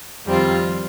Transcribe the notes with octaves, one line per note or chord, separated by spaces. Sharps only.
F2 D#3 G3 C4 F4